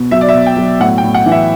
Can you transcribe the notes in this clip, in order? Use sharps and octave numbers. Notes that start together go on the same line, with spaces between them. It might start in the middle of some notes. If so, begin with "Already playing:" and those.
Already playing: B2
F#3 E5
D5
E5
B2
G5
F#3
A2 F#5
G5
A2
F#5
E3
E5